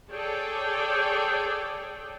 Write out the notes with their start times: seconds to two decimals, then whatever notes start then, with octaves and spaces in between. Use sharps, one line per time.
0.11 G#4 A4 C#5 D5 G5